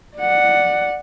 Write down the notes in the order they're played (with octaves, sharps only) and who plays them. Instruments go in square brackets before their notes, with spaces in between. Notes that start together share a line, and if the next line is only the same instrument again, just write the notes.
[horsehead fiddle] D5 F#5